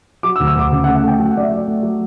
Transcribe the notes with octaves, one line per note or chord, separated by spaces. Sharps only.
F#3 D6
E6
D2
E6
D2 D6
C#3
F#5
A3
F#5
A3 G5
F#3 G5
F#5
A3 D5
E5
F#3 D5
A3
F#3